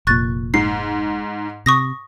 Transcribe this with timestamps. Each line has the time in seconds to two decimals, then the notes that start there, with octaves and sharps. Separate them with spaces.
0.07 F1 A#2 C#6 F#6 A6
0.54 G#2 C7
1.66 C3 C#6 D#6 A#6